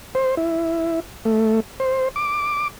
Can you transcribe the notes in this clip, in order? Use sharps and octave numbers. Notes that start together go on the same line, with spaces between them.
C5
E4
A3
C5
D6